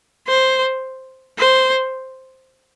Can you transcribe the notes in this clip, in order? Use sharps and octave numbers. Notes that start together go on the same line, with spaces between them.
C5
C5